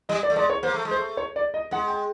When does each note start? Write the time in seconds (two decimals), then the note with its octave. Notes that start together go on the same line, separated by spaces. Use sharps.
0.09 G3 D#5
0.23 D5
0.30 A3
0.36 G#3 D5
0.50 C#5
0.63 A#3 C5
0.74 A3
0.85 G#3
0.91 C5
0.96 A3
1.17 C#5
1.36 D5
1.54 D#5
1.71 G#3 F#5
1.88 G5